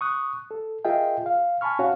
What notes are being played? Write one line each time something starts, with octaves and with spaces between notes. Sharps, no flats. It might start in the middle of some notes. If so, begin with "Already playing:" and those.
C#6 D#6 F#6
A4
F4 G#4 A#4 D#5 E5 G5
F5
G#5 A5 B5 C#6 F6
C#4 F#4 C#5 F5 F#5